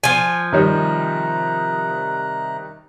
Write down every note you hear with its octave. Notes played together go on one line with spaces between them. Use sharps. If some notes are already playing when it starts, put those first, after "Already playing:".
F3 G#5
C3 D#3 G3 D#4 A#5 F#6